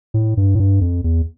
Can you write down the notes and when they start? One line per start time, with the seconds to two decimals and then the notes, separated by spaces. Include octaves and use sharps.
0.14 A2
0.37 G2
0.55 A2
0.60 G2
0.81 F2
1.04 E2